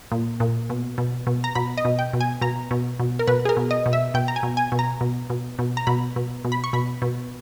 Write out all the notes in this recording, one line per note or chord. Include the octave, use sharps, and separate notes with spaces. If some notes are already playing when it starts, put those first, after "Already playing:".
A#2
A#2
B2
B2
B2
A#5
B2 B5
D#5
B2
G5
B2
G#5
B2 A#5
B2
B2
A#4
B2 B4
G#4
A#4
B2
D#5
B2
E5
B2 G5
A#5
G#5
B2
G#5
B2
A#5
B2
B2
B2
A#5
B2 B5
B2
B2
B5
C#6
B2 B5
B2